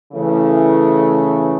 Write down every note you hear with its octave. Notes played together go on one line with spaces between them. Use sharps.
C#3 E3 A3